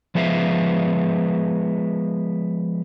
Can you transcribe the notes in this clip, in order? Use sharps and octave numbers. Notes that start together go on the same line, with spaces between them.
F3 G#3 B3 E5 F5